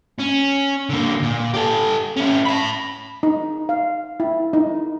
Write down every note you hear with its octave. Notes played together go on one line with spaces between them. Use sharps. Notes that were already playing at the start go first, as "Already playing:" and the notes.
C#4
D3 A#3
A#2
G4 A4
C#4 E4
A5 B5
D#4
F5
E4
D#4